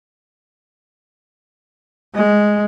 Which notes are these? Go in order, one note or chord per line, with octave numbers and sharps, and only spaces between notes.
G#3